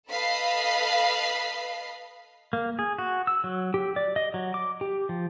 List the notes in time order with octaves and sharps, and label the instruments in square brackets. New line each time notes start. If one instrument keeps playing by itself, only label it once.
[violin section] A4 B4 D#5 F5 B5 C7
[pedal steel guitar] A#3
G#4
F#4
E6
F#3
G4
D5
D#5
F#3
D6
G4
F3